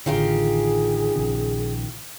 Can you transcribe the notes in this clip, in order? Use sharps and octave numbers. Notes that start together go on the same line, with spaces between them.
A1 D3 D#3 F4 G4 G#4
A#1 C#3